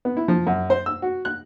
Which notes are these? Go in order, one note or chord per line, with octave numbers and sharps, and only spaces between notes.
B3
E4
F3
F#2
C5
E6
F#4
F#6